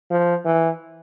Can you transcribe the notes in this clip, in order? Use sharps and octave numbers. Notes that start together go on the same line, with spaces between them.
F3
E3